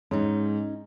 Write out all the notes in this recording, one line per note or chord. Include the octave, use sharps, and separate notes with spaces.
G#2 C#4 D#4